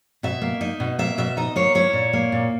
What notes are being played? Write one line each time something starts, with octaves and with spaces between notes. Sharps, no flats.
B2 E5
A#3
D#4
B2
A#3 E5
B2 E5
D#4 D#5
A#3 C#5
E4 C#5
A#2
A#3
A#2